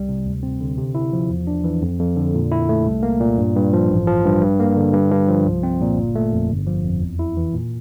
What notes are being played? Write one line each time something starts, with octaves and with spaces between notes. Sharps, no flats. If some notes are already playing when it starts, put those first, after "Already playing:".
Already playing: C2 G3
C3
D2
C4
D3
C3
E4
F3
E2
D4
E3
F2
F2
D3
A#2
E4
A3
C2
A#3
A#2
G2
G2
F3
A1
F3
G2
G2
A#3
D3
G2
G2
F3
C2
C4
A#2
G1
A3
F2
G1
F3
F2
E2
E4
E3
A#2